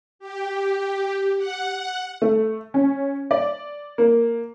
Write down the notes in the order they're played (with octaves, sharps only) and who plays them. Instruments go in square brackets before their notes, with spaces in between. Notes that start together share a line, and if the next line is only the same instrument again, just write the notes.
[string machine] G4
F#5
[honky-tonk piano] A3
C#4
D5
A#3